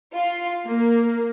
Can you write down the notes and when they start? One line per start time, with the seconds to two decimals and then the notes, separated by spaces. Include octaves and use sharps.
0.13 F4
0.66 A#3